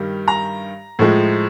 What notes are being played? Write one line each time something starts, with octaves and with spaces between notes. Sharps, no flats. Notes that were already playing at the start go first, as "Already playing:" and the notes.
Already playing: G2 D#3 G3
A#5
A2 F3 G#3